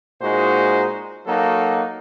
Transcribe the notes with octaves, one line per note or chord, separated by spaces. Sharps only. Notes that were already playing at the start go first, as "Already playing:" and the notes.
A#2 G#3 D#4 F#4 C5
F#3 A#3 D#4 F#4 A4